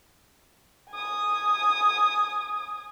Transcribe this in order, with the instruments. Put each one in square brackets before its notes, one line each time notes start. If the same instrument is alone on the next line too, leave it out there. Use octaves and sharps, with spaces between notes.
[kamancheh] G#5 D#6